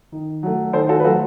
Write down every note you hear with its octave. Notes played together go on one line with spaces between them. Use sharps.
D#3
F#3 A3
D#3 A4 C5
F#4 A4
B4
F#3 A3 F#4 A4